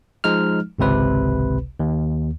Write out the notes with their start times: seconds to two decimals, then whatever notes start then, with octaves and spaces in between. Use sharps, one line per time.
0.24 F3 G#3 D#4 F6
0.79 G#1 C#2 C3 B4
1.80 D#2